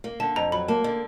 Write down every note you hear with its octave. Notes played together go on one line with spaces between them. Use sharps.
A#3
D3 A5
F2 A#5
F#3 B5
A#3 A5
D3